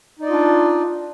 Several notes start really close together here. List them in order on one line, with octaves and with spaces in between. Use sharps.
D#4 D5 D#5 F4 D4